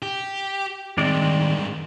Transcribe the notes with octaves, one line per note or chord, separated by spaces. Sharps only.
G4
G2 D#3 G#3 C4 D5